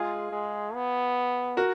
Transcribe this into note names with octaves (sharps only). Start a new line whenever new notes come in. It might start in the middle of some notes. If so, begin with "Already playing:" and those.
Already playing: G#3 F4 G#4
G#3
B3
F#4 A#4